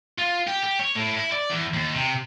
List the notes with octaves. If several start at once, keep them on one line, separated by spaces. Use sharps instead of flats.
F4
G4
G4
C#5
A2
E4
D5
E2
D#2
C3